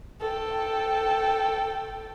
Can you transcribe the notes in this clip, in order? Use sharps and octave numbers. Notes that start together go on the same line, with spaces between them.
A4 G5